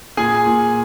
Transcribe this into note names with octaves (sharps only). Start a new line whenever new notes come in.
A#2 G#4 G#5
A#2